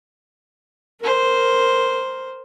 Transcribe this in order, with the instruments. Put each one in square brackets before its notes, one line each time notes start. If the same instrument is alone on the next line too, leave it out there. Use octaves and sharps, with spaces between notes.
[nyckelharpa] A#4 C5